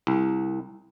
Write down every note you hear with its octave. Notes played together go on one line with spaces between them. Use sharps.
C2